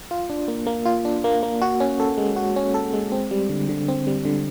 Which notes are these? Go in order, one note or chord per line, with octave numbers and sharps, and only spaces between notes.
F4
D4
A#3
A#3
F4
D4
A#3
A#3
F#4
C#4
A4
G#3
F#4
C#4
A4
G#3
C4
G3
D3
D3
C4
G3
D3